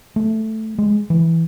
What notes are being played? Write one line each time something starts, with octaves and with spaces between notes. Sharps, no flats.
A3
G#3
E3